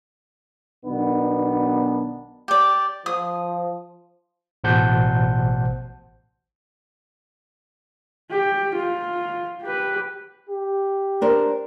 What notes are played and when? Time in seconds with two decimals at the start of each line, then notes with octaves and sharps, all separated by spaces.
0.86 B1 B2 D#3 B3 D4
2.48 G4 D5
3.06 F3 D#6
4.64 A1 B2 C5 F#5 A5 G6
8.31 G4
8.75 F4
9.62 G4 B4
10.50 G4
11.21 D4 A#4 C5